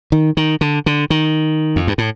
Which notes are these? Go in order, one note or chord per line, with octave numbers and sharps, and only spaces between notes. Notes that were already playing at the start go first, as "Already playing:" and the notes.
D#3
D#3
D3
D3
D#3
F2
G2
A2